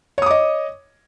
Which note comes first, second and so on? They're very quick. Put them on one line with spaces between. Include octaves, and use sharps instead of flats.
C#5 D#6 D6 D#5